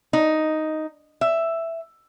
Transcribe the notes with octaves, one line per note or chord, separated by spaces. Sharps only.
D#4
E5